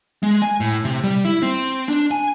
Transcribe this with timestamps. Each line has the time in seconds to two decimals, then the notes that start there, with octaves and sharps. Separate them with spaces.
0.23 G#3
0.42 G#5
0.60 A2
0.85 C3
1.04 G3
1.25 E4
1.42 C4
1.88 D4
2.11 G#5